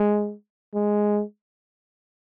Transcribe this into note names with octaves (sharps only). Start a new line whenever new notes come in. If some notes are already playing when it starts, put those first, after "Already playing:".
Already playing: G#3
G#3